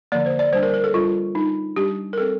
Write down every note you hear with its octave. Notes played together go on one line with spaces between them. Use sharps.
D3 F3 A#3 D5
C5
D5
G3 D4 C5
A#4
A#4
A4
G3 D4 F4
G3 D4 D#4
G3 D4 G4
A#4
G3 C4 A4